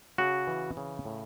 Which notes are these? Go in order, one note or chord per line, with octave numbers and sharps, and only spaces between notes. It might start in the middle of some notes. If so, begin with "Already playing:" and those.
C#3 F#4
E3
C#3
A2